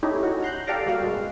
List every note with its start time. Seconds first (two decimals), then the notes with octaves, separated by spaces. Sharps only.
0.03 A3 C#4 D#4 E4 G4
0.23 C#4 F#4
0.43 A#5 C6 F#6 G6
0.67 G4 A4 D5 F5 A#5 D6
0.86 G3 A#3 F#4 F5
1.01 F#2 B2 G#3